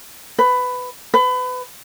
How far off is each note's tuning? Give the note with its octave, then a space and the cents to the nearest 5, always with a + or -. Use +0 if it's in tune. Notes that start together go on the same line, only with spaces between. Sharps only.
B4 +15
B4 +30